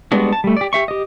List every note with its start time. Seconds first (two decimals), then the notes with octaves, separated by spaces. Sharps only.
0.12 G3 G#3 B3 D4 F#4
0.32 A5
0.44 G3 A3
0.57 G4 D5
0.73 G4 E5 C#6
0.88 G4 D#5